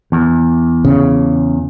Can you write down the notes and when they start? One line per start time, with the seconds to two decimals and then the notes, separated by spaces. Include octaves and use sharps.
0.12 E2
0.85 C#3